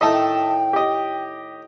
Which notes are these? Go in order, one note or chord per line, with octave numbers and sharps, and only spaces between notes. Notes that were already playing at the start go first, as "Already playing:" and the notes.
A2 D#3 A3 D#5 E5 G5 A5
G4 D#5